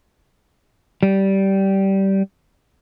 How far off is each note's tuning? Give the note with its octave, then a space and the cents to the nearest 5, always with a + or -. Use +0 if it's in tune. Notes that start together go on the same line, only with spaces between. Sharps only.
G3 -15